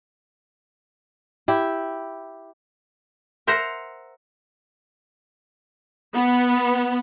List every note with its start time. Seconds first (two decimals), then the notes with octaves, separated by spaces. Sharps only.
1.48 E4 G4
3.47 A#4 C5 E5 F#5 A#5
6.14 B3